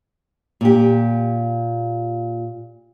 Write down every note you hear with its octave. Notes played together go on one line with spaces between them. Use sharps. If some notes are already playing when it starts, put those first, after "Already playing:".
A#2 G4